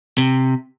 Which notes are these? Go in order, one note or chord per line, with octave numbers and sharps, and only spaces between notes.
C3